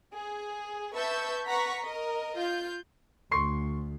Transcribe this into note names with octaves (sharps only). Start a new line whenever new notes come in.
G#4
B4 E5 A5 C#6 E6 G6
B4 F#5 A#5 C#6 B6
A#4 D#5
F4 G6
D2 C6 C#6 C7